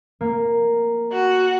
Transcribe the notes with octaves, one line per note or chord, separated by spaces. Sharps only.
A#3
F#4